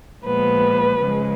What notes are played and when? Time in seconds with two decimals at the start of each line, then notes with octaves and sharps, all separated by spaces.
0.23 A#2 F3 G#3 B3 B4
1.02 C#3 F3 G#3